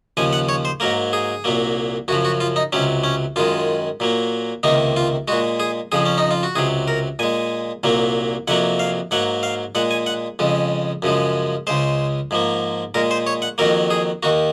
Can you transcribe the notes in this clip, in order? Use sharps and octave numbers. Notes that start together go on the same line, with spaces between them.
D#2 C#3 F3 G#5
F#5
C#5
C5
G#2 F#3 A#3 A#4
G#4
C2 A#2 F#3 A#3
F#2 C#3 F3 F#4
F#4
F4
D#4
C#2 C3 F#3 C#4
C#4
F#2 D#3 G#3 F4
A#2 F#3 A#3
C#2 C3 D#3 A#3 D#4
F4
A#2 G#3 F#4
G#4
F2 C#3 F3 G#4
C#4
D#4
F4
F#4
C#2 C3 F#3 G#4
A#4
A#2 G#3 G#5
C2 A#2 F#3 A#3
F2 C3 F#3 A#3 F#5
F5
G#2 F#3 A#3 F#5
F5
A#2 G#3 F#5
G#5
F#5
F2 C#3 G#3
F#2 C#3 F3 G#3
C#2 C#3 G#3 C5
G#2 F3 A#3
A#2 G#3 A#4
C5
C#5
F#5
F2 D#3 F#3 A#3 A#4
G#4
D#2 D#3 A#3 F#4